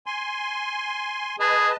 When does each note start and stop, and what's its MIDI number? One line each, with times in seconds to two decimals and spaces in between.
0.06 1.36 80
0.06 1.36 84
1.40 1.69 68
1.40 1.76 71
1.40 1.76 75
1.40 1.76 81